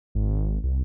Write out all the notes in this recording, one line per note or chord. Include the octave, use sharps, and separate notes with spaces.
G#1
C2